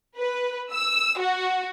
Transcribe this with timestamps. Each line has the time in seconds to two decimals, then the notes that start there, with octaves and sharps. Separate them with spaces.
0.17 B4
0.72 E6
1.20 F#4